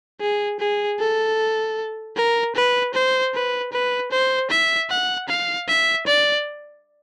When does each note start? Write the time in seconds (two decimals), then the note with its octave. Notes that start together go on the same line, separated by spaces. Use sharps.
0.21 G#4
0.60 G#4
0.99 A4
2.16 A#4
2.55 B4
2.94 C5
3.34 B4
3.72 B4
4.12 C5
4.50 E5
4.90 F#5
5.29 F5
5.68 E5
6.07 D5